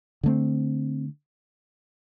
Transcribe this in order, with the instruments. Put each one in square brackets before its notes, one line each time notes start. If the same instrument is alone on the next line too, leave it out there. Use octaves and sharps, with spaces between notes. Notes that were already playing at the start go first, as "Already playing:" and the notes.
[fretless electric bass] D3 A3 C4